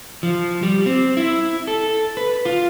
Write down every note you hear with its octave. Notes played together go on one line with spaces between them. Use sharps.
F3
G3
C4
E4
A4
B4
F4